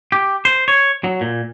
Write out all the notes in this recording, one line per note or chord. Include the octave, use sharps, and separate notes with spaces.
G4
C5
C#5
F#3
A#2